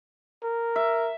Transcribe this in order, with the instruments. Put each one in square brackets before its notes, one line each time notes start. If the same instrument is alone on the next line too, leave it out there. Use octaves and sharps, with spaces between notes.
[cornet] A#4
[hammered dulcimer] E5